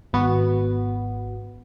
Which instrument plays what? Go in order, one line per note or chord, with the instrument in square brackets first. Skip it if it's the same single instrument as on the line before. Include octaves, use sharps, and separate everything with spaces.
[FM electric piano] G#1 B3 F#4